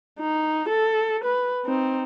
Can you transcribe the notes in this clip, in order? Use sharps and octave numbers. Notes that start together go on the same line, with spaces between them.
D#4
A4
B4
C4 D#4